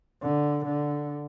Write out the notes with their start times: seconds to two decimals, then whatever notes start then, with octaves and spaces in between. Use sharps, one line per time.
0.22 D3
0.65 D3